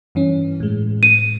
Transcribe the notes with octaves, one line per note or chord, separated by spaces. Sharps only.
G2 E3 C#4
A2 G#3
D#7